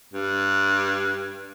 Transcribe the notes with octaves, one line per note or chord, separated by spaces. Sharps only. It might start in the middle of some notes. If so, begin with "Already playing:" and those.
G2